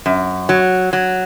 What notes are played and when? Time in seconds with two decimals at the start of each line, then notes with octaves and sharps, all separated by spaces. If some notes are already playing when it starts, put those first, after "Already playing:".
0.06 F#2
0.49 F#3
0.93 F#3